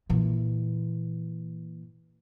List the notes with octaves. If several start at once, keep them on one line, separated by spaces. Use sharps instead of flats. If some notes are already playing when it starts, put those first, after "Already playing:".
A#2 E3